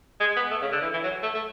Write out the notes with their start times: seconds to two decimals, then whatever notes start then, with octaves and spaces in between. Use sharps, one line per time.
0.20 G#3
0.36 B3
0.51 A3
0.61 C#3
0.72 D3
0.82 E3
0.93 E3
1.03 F#3
1.23 A3
1.34 A3